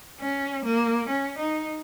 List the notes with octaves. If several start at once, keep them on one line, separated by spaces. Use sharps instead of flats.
C#4
A#3
C#4
D#4